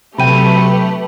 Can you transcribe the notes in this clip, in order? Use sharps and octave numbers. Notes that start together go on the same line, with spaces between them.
C3 F#3 A3 G4 B4 G5 B5 D#7